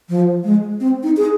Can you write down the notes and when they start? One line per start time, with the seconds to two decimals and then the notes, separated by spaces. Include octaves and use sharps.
0.09 F3
0.44 G#3
0.80 C4
1.03 D#4
1.17 G#4